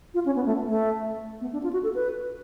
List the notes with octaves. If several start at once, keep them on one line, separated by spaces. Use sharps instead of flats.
F4
C#4
B3
A3
A3
B3
D4
F4
F#4
A4
B4